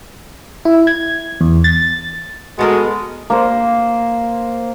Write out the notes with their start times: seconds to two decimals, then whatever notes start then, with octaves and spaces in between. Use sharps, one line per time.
0.65 E4
0.87 G#6
1.41 E2
1.64 A6
2.59 G#3 B3 F#4 A4 A#4
3.30 A#3 C5